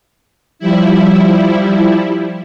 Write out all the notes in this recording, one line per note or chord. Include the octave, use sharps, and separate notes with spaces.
F3 G3 E4